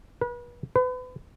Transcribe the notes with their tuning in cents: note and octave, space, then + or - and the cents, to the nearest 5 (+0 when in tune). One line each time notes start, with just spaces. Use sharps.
B4 -35
B4 +35